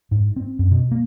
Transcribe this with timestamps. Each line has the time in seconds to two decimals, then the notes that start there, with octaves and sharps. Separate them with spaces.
0.11 G#2
0.36 C4
0.59 F#2
0.71 B2
0.91 A#3